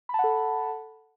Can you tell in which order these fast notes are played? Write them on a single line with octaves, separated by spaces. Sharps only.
B5 A5 F#5 A4